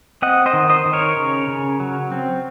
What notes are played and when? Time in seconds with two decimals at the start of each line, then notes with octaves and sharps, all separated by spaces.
0.22 C4 D#5 F#5
0.46 C5 D#5
0.53 D#3
0.70 C5 D#5
0.86 D#3
0.93 A#4 C#5
1.17 C#3
1.48 C#3
1.80 F#3
2.12 C4